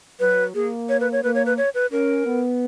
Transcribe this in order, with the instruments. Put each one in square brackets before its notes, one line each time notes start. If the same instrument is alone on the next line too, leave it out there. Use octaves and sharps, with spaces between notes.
[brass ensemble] F#3 [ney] B4
[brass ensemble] A#3 [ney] G#4
[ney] C#5
B4
C#5
[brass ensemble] A#3 [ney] B4
[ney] C#5
B4
C#5
B4
[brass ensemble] C#4 [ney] A#4
[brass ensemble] B3